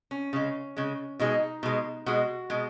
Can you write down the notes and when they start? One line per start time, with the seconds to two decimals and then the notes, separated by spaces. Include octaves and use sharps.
0.11 C#4
0.33 C#3 G#3
0.77 C#3 G#3
1.19 B2 G#3 D#4
1.63 B2 G#3
2.06 B2 G#3 F#4
2.50 B2 G#3